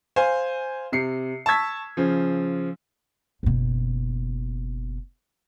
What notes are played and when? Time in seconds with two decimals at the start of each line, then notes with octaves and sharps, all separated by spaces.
0.16 C5 F5 G#5
0.92 C3 C7 C#7
1.46 A5 C#6 E6 G#6 B6
1.97 C#3 F3
3.43 F#1 B2